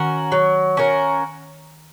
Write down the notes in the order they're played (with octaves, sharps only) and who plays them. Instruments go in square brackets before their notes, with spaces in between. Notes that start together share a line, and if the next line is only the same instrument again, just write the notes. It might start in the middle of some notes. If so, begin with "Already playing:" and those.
Already playing: [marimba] D#3 [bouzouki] C#4 F#4 A#4
[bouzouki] F#3
C#4 F#4 A#4